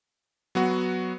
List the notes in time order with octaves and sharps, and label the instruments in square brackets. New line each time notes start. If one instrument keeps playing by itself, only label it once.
[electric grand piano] F#3 B3 F#4